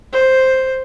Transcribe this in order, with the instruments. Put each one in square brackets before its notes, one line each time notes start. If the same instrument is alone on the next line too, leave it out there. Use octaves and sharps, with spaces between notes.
[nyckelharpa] C5